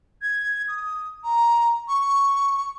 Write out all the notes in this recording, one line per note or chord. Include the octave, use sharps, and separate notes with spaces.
G#6
D#6
A#5
C#6